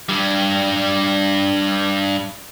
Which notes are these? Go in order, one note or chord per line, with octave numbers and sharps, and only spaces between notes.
G2 G3